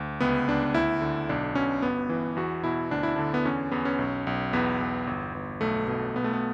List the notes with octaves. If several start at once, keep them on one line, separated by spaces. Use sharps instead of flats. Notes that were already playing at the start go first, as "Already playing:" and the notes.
Already playing: D2
C#2 B3
C#2 D4
D2 E4
D3
B1 D4
B2 C#4
G1 B3
E3
E2 F#4
B2 E4
D2 D4
E4
D3 D4
B3
E2 C#4
E2 B3
C#4
B1
B1
E2 B3
E2
G1
G1
B1 A3
B2 A3
B1 B3
A3
B3